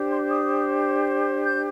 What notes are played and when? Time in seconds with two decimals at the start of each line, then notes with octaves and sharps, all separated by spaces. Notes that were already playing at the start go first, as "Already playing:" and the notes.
Already playing: D4 G4 C5
0.10 C6
0.29 D#6
1.44 G6